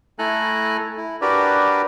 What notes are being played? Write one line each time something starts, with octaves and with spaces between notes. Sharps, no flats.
A3 E4 A4 G#5 A#5 F#6
E4
D4 F#4 G4 A#4 B4 D5